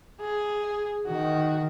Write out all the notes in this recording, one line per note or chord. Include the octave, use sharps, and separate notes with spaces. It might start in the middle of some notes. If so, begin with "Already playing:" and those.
G#4
D#3 F#4